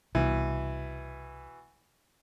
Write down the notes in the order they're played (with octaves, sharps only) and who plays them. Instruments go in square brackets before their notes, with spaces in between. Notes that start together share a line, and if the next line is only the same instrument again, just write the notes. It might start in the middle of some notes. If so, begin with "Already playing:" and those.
[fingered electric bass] C2 [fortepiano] B2 E3